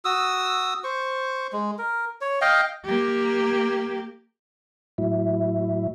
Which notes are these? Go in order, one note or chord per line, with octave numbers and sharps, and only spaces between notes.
F#4 D#6 E6
C5 C#6
G#3
A#4
C#5
D#5 F5 G5
A#3 G4
A2 F#3 E4